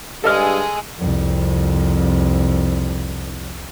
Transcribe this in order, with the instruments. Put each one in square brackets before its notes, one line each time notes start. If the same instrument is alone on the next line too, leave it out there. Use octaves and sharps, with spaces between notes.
[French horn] G2 [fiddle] G#3 G#4 [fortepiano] A4 D#5 F6
[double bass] C2 F2